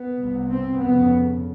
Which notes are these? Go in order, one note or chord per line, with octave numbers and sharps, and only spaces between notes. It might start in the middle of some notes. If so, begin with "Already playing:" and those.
Already playing: B3
C2 C3
C4
F2 C#3 B3